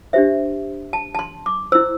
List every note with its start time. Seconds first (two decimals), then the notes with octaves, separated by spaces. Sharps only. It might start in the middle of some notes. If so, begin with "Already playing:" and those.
0.13 D4 G4 C5 E5
0.93 A5
1.15 A5
1.19 C6
1.46 D6
1.72 E4 C5 E6